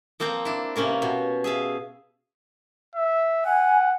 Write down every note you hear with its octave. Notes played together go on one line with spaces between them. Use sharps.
F3 A#3 C4 G5 A#5
D4 E4
C3 A#3 C#4 A#4
B2
G#4 E5 F5
E5
F#5 G#5